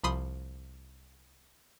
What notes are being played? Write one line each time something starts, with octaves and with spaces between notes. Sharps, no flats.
C2 F3 B5 C6 D#6